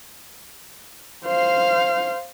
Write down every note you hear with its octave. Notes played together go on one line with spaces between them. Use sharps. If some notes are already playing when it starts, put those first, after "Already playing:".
C5 F5